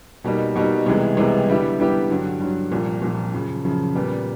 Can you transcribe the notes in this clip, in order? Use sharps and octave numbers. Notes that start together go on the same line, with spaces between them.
B2 G3 A#3 D#4
B2 G3 A#3 D#4
C2 C3 E3 G#3 B3
C2 C3 E3 G#3 B3
D3 G3 B3 E4 G4
D3 G3 B3 E4 G4
G2 D3 F#3
G2 D3 F#3
C2 A#2 F3
C2 A#2 F3
F#2 C#3 F3
F#2 C#3 F3
A#2 G3 B3